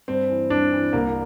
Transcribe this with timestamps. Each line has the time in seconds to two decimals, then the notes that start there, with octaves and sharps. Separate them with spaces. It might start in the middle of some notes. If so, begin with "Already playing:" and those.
0.08 G2 C4
0.30 E3
0.50 G2 D4
0.72 E3
0.93 C2 A#3